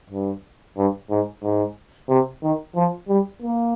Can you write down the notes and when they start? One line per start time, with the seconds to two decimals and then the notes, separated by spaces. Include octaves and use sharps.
0.10 G2
0.77 G2
1.10 G#2
1.43 G#2
2.09 C3
2.43 D#3
2.75 F3
3.08 G3
3.42 A#3